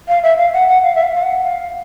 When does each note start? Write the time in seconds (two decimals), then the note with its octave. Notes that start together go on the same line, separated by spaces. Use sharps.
0.08 F5
0.23 E5
0.38 F5
0.53 F#5
0.68 F#5
0.83 F5
0.95 E5
1.03 F5
1.14 F5
1.23 F#5
1.43 F5